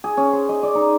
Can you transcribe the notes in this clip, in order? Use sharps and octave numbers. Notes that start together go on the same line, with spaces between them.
G#4
C#4
C5
D#5
D5
D#4